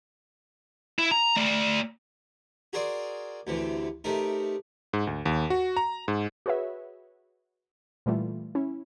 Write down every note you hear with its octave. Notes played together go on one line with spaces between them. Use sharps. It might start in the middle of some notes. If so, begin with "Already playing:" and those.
E4
A#5
A3 D5
F#4 G#4 A#4 C5 D5
D2 C3 E3
C3 A3 D#4 A#4
G#2
D2
D#2
F#4
A#5
G#2
F#4 G#4 B4 C#5 E5
A#2 E3 G3 A3 F4
C#4 E4